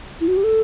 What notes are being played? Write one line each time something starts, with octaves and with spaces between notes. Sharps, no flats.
E4
F#4
G4
A4